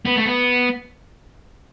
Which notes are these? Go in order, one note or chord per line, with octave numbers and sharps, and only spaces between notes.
B3
A3
B3